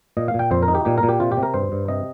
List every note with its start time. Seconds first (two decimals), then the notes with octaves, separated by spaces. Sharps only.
0.17 A#2 D#5
0.28 F5
0.34 A#2
0.39 G5
0.51 F2 C5
0.63 A#4
0.68 D#4
0.75 G4
0.85 A#2 G4
0.98 A#4
1.03 A#2
1.09 G4
1.20 C3 F4
1.32 G4
1.37 C3
1.43 A#4
1.54 G2 C5
1.72 G2
1.88 C3 D#5